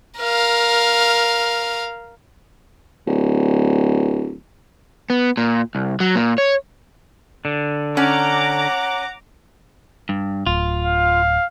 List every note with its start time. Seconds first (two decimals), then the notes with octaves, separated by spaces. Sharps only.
0.19 A#4 F5
3.07 D1
5.10 B3
5.37 A#2
5.75 C2
6.00 F#3
6.16 A#2
6.38 C#5
7.45 D3
7.97 C#4 F#5 A#5 D6
10.09 G2
10.47 D1 F4
10.85 F5